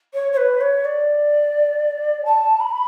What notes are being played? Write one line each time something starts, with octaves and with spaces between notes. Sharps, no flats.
C#5
C#5
B4
C#5
D5
A5
B5